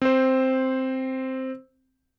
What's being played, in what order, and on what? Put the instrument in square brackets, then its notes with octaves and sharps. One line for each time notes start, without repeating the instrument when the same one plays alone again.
[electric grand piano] C4 C5